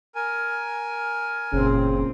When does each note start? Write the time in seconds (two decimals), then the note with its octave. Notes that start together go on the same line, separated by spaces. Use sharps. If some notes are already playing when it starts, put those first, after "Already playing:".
0.15 A#4 G#5
1.53 F#1 A#2 C#3 C4